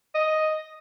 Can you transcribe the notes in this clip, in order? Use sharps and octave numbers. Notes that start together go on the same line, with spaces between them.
D#5